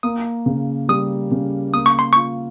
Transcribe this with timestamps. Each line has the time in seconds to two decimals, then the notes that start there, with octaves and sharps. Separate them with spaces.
0.03 A#3 D#6
0.46 C#3
0.89 G3 D#6
1.31 C#3
1.73 A#3 D#6
1.86 C#6
1.99 C6
2.13 F4 C#6